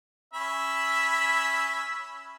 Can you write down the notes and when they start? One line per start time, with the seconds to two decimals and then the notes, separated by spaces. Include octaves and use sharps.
0.34 C#4 E5 B5